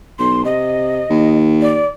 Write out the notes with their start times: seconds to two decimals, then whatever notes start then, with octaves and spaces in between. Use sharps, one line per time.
0.19 B1 C6
0.45 C3 D#5
1.10 D#2
1.61 D5